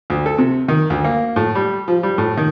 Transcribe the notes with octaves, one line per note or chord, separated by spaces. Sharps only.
D2
A4
C3
D#3
D2
A#3
A2
G3
F3
G3
A2
D#3